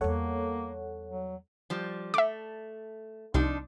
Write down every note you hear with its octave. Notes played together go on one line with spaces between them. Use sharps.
E2 G3 A#3 A4 C#5 F#5
F#3
F3 G3
A3 E5 D6
C2 F3 D4 D#4